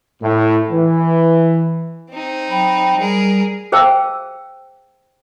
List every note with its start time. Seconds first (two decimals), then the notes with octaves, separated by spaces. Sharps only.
0.22 A2
0.71 E3
2.10 C4 D#4
2.50 F#3 G5 B5
3.00 G3 G#4 A#4
3.72 G#4 C5 F5 G5 A5 E6